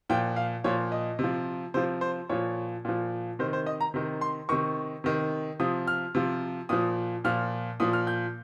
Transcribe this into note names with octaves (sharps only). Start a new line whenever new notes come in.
A#2 F3 G5
F5
A#2 F3 C#5
D#5
C3 F3
C3 F3 C5
C5
A#2 F3 C#5
A#2 F3
C3 D#3 C5
C5
D#5
A#5
C3 D#3
C6
C3 D#3 C#6
C3 D#3
C3 F3 D#6
F6
C3 F3
A#2 F3 D#6
A#2 F3 F6
A#2 F3 D#6
F6
G6